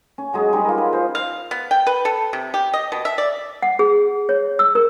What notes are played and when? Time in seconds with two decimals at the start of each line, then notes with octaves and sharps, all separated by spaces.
0.18 C#4
0.33 F#3 G#3 G#4
0.53 G3 D#4 B4
0.65 F4 A#4
0.78 B4
0.93 C5
1.15 F5
1.51 B3
1.71 G5
1.87 B4
2.05 A4
2.33 C3
2.54 G4
2.74 D#5
2.92 B2
3.05 E5
3.18 D5
3.62 F#5
3.79 G#4
4.29 C#5
4.59 E6
4.75 A#4